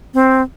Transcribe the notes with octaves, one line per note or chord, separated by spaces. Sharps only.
C4